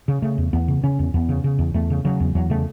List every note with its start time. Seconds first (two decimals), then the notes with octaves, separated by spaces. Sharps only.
0.08 C#3
0.22 C#3 A3
0.38 E2
0.53 E2 B3
0.68 C#3
0.83 C#3 C#4
0.99 E2
1.14 E2 B3
1.29 C#3
1.44 C#3
1.59 E2
1.74 E2 A3
1.90 C#3
2.05 C#3 F#3
2.20 E2
2.35 E2 F#3
2.50 C#3 A3